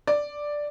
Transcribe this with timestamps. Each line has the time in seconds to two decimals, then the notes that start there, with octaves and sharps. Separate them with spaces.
0.07 D5